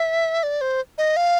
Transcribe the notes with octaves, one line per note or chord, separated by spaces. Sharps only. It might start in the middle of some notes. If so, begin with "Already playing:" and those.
Already playing: E5
D5
C5
D#5
F5